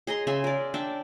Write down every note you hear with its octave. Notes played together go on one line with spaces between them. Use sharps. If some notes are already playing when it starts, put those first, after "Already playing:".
G#4 D#5 A#5 C6
C#3 E5 G#5 C6
A#4 D5
D4 E5 G5